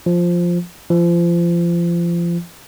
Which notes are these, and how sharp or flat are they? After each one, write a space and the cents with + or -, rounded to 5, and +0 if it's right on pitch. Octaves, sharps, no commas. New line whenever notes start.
F3 +0
F3 -30